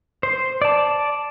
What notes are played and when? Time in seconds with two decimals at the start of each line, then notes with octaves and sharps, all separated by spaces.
0.23 C5
0.62 D5 A5